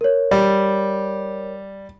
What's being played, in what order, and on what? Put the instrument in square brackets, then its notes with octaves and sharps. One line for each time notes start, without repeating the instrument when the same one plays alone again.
[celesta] A#4 C#5
[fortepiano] G3